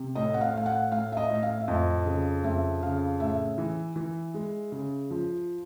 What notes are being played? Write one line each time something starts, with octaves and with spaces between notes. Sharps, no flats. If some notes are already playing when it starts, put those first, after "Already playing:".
Already playing: C3
A2 D#5
F#5
F5
A2 F5
F#5
A2 F5
E5
D#5
A2
F5
E5
F2 D#5
C#3
F2 E5
C#3 F5
A2 E5
E3
E3
G#3
C#3
F3